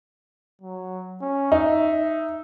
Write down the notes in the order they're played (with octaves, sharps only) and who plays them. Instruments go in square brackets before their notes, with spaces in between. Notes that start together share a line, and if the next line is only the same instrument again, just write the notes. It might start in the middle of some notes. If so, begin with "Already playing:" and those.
[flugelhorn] F#3
C#4
[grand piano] D#4 [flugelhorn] E5